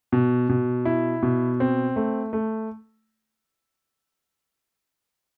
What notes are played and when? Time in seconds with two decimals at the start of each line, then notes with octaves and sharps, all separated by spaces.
0.12 B2
0.49 B2
0.85 E4
1.23 B2
1.60 C4
1.96 A3
2.33 A3